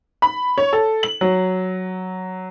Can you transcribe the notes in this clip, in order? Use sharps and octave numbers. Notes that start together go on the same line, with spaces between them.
B5
C#5
A4
F#7
F#3